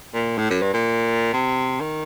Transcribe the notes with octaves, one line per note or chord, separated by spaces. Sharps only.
A#2
A2
F#2
G2
A#2
C3
D#3